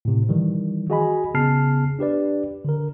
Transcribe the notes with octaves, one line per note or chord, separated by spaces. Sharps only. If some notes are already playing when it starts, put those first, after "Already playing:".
A2 C3
D#3 E3 G3
F#4 G#4 D#5 G#5 B5
C#3 B3 G#4 A5 F6 C7
D4 G4 B4 D5
D3 A#4